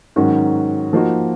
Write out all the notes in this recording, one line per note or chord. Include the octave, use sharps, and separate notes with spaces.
G#2 D#3 F#3 C#4 F#4
F3 A#3 D#4 F#4